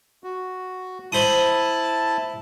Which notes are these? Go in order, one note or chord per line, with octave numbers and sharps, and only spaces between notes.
F#4
E4 C5 A5 B5 D#6